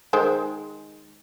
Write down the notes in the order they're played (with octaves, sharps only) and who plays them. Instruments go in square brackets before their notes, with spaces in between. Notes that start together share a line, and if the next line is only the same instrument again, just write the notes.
[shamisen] D#3 G#3 C5